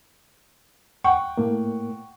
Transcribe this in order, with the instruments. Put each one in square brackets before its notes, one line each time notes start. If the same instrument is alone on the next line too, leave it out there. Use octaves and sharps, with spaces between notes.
[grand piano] F#5 G5 C#6
[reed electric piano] A2 A#3